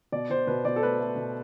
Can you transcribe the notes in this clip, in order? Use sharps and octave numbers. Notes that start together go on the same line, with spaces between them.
B2 D5
B2 C5
B2 B4
B2 D5
A4
A3 B4
A3
B2